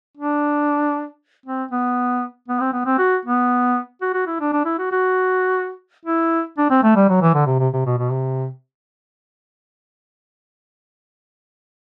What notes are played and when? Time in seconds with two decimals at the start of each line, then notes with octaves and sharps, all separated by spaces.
0.17 D4
1.46 C4
1.71 B3
2.48 B3
2.60 C4
2.73 B3
2.86 C4
2.99 F#4
3.25 B3
4.02 F#4
4.14 F#4
4.27 E4
4.40 D4
4.53 D4
4.65 E4
4.79 F#4
4.92 F#4
6.06 E4
6.58 D4
6.70 C4
6.83 A3
6.96 G3
7.09 F#3
7.22 E3
7.35 D3
7.46 C3
7.59 C3
7.73 C3
7.86 B2
7.98 B2
8.11 C3